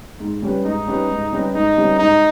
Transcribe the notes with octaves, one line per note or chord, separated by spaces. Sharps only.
G#2
G3 C#4 G4 B4
G#2 D#4
G3 C#4 G4 B4
G#2
G3 C#4 G4 B4
G#2 D#4
G3 C#4 G4 B4
G#2 D#4